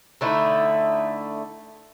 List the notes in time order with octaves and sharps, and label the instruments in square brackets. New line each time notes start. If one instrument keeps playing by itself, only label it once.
[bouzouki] D3 A3 D#4 E4